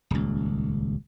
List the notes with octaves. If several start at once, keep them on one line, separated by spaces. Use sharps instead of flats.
D#1 C#2